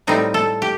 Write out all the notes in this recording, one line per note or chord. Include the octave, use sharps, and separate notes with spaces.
A2 G3 C4 D#4
A4
G4